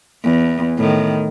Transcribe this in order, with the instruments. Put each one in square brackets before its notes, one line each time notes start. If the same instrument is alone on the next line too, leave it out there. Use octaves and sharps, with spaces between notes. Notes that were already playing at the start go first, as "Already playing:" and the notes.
[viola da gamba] E2
A2 D#3